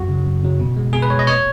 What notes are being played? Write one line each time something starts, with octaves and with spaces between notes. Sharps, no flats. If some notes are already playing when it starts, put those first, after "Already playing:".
Already playing: F#2 F#4
C#3 F#3
F#2
C#3 F#3
B2
G#3
B2 G#4
B4
G#3 C#5
D#5
A#2 C#5